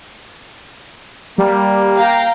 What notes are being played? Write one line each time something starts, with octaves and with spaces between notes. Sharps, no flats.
G3 A#3
F5 G5 A#5